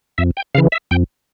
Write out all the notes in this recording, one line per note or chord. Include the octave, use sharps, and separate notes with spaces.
F2 E5
G5
C#3 E3 F5
E5
F2 G5